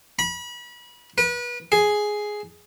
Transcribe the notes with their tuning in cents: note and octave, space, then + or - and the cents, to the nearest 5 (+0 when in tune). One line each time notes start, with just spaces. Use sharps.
B5 -30
B4 -30
G#4 +5